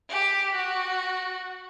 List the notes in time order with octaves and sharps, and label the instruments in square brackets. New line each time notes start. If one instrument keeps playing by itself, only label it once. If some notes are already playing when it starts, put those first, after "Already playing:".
[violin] G4
F#4